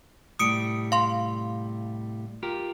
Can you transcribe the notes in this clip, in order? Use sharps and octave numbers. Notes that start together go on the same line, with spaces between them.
C2 A2 G3 D#6 C#7 D7
F5 C6
F4 G4 A#4